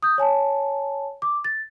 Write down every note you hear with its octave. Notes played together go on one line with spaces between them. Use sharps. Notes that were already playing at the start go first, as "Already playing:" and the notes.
D#6 G6
C#5 G#5 A5
D6
A6